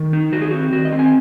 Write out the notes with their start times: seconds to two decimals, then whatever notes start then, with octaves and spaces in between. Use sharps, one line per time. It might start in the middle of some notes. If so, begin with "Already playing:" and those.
Already playing: D#3
0.13 D#4
0.32 D#3 F#4
0.41 G#4
0.51 C4 F#4
0.72 D#3 F#4
0.85 D#5
0.92 C4
0.99 G#5